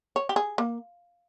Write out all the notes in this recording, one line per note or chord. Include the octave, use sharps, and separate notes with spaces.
C#5
G4
G#4
A#3